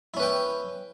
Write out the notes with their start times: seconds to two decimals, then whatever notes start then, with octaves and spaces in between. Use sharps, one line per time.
0.14 E4
0.17 C#4
0.20 B4
0.23 G5